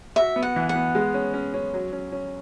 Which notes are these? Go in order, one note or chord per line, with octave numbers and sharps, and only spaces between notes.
F#4 E5
B3
F#5
E3
F#5
B3
G#3
C#4
C#4
C#4
F#3
C#4
C#4